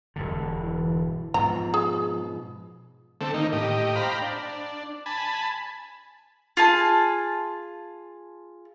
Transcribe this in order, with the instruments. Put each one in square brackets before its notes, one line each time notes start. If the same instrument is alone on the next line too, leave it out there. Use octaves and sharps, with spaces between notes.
[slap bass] E1 G2 D3
[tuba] E3
[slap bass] G#2 B2 [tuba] F3 [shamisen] A#5
[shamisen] G#4
[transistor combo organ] D3 A3 C4 A4
D#3 A#3 D#4
A2 G4 D#5
C5 F5 G5 A#5 B5
D4
G#5 A5 B5
[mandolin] F4 G#4 A5